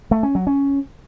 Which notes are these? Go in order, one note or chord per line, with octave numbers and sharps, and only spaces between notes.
A3
C#4
F#3
C#4